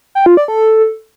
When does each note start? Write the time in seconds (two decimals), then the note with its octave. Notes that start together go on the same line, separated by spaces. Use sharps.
0.15 G5
0.26 F4
0.37 D5
0.48 A4